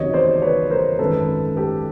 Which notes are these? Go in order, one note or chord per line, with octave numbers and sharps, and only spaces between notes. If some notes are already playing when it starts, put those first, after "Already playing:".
Already playing: F#1 E2 C3 D#3 F#3 C#5 D#5
C5 D5
B4 C#5
A#4 C5
G#1 F#2 C#3 A4 B4
G4 A4